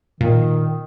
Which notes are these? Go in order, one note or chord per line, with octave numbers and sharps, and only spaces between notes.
A#2 D#3